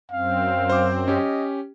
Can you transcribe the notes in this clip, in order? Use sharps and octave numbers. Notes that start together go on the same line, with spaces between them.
F#2 C4 F5
C5 D6
C#4 G4 D#5